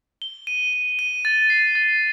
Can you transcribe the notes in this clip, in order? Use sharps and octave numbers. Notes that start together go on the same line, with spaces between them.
G7
D#7
D#7
D#7
A6
C7
A6